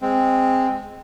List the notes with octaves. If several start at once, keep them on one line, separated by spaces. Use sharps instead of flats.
G#3 C4